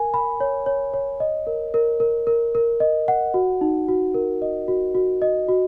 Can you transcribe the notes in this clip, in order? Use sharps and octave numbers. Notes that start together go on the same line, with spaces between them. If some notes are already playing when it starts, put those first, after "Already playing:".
Already playing: A#4 G#5
B5
C#5
C#5
C#5
D#5
A#4
A#4
A#4
A#4
A#4
D#5
F#5
F#4
D#4
F#4
A#4
D#5
F#4
F#4
D#5
F#4